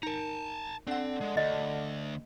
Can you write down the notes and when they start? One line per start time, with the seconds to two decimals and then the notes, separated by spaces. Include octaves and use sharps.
0.03 D#4 A#4 A5 A#5
0.87 D3 C4 D4 F#5
1.21 G#3
1.37 D2 D#5